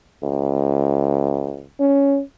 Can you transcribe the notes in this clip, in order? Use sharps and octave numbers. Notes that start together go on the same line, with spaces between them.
C#2
C#4